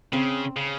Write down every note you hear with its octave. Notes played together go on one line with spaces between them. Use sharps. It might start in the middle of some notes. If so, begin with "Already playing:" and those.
C#3 C4
C#3